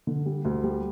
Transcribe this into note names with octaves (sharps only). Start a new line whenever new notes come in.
D3
G3
D2
G3